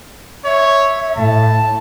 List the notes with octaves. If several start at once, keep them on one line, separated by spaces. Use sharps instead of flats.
C#5 E5
A2 A5